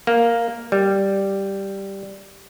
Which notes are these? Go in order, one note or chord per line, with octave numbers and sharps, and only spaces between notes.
A#3
G3